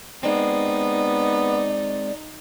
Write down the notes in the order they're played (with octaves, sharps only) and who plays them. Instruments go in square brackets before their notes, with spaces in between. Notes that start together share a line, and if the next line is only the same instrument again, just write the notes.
[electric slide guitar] G#3 C4 [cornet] B3 [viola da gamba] D#4 [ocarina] D5